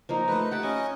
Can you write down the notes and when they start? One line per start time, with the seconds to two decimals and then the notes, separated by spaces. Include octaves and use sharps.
0.09 F3 A#3 D#4
0.28 A3 D#4 B4
0.51 G4 F#5 G5 A5
0.63 C#4 D#5 G#5